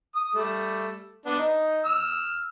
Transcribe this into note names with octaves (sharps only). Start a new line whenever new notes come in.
D#6
G3 A3
B3 D4
D#4
E6 F6